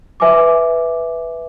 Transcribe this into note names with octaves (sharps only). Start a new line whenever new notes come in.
B4 E5 G#5 D6